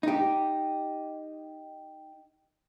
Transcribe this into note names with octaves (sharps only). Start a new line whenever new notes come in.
D#4 G4